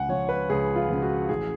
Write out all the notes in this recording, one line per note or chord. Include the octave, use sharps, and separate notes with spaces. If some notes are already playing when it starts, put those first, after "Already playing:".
Already playing: C#2 F#5 G#5
C#3 F3 C#5
B4
C#2 G#4
F4
C#3 F3
F#4
A1 G#4